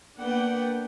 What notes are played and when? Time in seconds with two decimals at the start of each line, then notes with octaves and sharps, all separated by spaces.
0.19 A#3 B3 D4 B4 F#5 G5